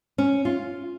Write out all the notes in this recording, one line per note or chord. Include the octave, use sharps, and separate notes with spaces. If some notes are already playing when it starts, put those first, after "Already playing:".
C#4
F4